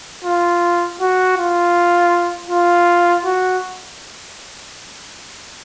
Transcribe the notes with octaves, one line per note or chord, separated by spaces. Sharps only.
F4
F#4
F4
F4
F#4